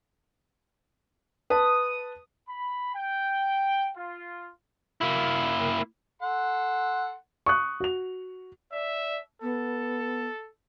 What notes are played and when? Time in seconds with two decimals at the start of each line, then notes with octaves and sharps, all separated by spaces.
1.50 B4 A5 D#6
2.49 B5
2.95 G5
3.97 F4
5.01 A#3 E4
6.22 A4 F#5 C6
7.46 C#6 D#6 F#6
7.80 F#4 F7
8.72 D5 E5
9.42 B3 A4